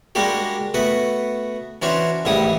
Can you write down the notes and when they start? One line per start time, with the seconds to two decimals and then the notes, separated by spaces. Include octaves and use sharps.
0.15 G3 G#3 A#3 D4 F#4 G4
0.74 A3 B3 F#4 B4
1.82 E3 C#4 D4 F#4 C5
2.25 A1 D#2 G#2 G3 E4 D#6